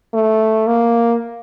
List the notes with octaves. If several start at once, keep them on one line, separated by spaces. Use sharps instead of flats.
A3
A#3